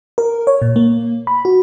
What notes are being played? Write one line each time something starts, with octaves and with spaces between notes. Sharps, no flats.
A#4
C#5
A#2
A#3
B5
F#4